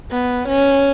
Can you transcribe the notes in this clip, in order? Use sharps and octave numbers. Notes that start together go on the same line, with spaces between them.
B3
C#4